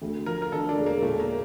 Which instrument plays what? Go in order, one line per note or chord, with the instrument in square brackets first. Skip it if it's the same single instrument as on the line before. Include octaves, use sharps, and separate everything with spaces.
[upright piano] D2
[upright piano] F3 [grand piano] A#4
[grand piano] A#4
[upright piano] D3 [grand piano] A4
[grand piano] D4
[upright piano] E1
[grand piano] A#3
[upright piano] A#2 [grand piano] A3
[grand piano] A#3